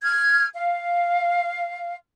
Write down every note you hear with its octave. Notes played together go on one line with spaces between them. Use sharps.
F6 G#6
F5